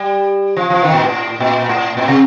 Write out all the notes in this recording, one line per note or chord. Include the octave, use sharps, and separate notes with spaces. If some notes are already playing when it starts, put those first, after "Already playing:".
Already playing: G3
F3
F3
D#3
A#2
A2
A#2
A2
A#2
C3